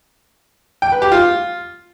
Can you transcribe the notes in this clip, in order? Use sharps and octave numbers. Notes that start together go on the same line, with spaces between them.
G5
B4
G4
F4